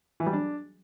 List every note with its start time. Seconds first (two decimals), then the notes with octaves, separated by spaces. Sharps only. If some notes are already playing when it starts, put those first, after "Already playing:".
0.20 E3
0.26 G3
0.33 D4